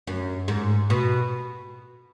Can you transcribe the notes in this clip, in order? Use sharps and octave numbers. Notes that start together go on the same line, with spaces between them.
F#2
G#2
B2